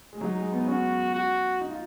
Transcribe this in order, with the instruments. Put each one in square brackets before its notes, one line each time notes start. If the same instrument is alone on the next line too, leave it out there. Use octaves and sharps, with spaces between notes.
[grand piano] G#3
[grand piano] F#3 [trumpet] D#4
[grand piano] G#3
B3
[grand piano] C#4 [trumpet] F#4
[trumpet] F#4
[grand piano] D#4
F4